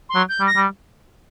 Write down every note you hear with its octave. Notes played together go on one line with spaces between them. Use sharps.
C6
F#3
G6
G3
A#6
G3